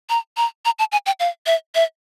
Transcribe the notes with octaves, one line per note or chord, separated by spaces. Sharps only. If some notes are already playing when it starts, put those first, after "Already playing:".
A#5
A#5
A#5
A5
G#5
G5
F5
E5
E5